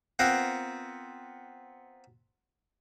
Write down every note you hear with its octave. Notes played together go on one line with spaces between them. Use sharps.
B3 C4 F4 A#4 F#5 A#5